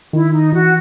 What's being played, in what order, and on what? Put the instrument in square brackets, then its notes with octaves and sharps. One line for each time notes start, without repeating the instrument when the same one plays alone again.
[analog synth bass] D#3 [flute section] E4
[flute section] D#4
[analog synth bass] E3 [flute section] F#4